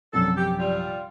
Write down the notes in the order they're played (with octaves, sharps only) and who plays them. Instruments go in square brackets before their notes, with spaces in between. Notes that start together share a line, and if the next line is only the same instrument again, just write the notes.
[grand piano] A#1 F#2 C3 [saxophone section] A4
[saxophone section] G4
G3 F4